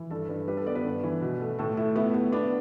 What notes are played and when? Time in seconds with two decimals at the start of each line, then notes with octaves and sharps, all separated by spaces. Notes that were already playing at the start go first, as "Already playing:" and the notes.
Already playing: E3
0.11 G2 A4
0.29 G2 B4
0.47 G3 B4
0.57 A4
0.66 B3 D5
0.75 B4
0.85 G2
1.04 E3
1.22 B2
1.40 A3
1.59 A2 A4
1.77 A3 E4
1.96 B3 E4
2.14 B3
2.32 B3 D4